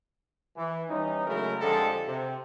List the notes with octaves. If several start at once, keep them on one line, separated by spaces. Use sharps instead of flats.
E3
E3 G3 C#4 D#4
C#3 F#3 G#3 A3 E4 A#4
F2 D3 F3 G#3 G4 A4
C3